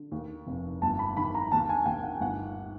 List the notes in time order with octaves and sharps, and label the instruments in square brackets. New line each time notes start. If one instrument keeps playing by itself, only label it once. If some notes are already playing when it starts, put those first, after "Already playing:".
Already playing: [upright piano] D3
D#2
F1
G1 A5
B5
D#3 B5
A#5
D#2 A5
G#5
D#2 G5
F#5
G1 F#5